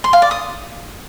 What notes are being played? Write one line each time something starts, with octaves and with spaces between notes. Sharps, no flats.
C6
F5
D5
D#6